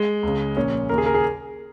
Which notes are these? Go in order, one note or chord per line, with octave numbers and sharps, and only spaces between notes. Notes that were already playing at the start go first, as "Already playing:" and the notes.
Already playing: G#3
C#2 C#3
A#1 A#2 C#4
D#2 C#3 A#4
G#4
A#4
G#4